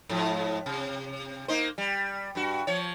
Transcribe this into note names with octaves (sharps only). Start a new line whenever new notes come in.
G#2 F3
C3
A#3 D#4 C5
G3
G2 F#4
F3 C#5